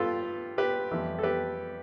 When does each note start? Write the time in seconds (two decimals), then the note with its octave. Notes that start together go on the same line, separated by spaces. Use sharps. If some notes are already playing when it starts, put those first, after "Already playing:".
Already playing: G2 F4 G4 A4 B4
0.58 G4 B4
0.91 F2 E3 G3
1.19 A4
1.23 G4 B4